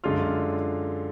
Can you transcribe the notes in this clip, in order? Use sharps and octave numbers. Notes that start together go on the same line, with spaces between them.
F#2 D3 G#3 D4 F4 F6